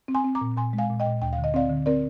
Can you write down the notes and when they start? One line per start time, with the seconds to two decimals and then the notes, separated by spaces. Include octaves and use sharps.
0.08 C4
0.15 G#5 C6
0.24 C4
0.35 A#5 D6
0.41 A#2
0.57 A#2 G#5 C6
0.73 G#3
0.78 F5 G#5
0.90 A#2
1.00 D#5 G5
1.06 A#2
1.22 D2 G5
1.33 F5
1.38 D3
1.44 D#5
1.54 C4 D5 F5
1.70 D3
1.86 C4 A#4 D5